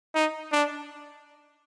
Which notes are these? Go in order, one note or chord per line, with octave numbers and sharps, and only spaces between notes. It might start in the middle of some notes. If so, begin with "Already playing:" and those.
D#4
D4